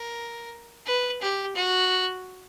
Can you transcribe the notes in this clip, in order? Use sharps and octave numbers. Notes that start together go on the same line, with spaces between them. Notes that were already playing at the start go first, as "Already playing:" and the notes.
Already playing: A#4
B4
G4
F#4